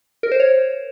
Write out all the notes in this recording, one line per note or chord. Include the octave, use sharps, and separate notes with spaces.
A#4
C5
C#5